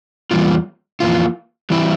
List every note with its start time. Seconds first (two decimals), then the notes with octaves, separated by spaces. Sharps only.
0.31 E2 C#3 G3 A#3 F4
1.00 F2 E3 A#3 F4
1.70 E3 G3 C4 E4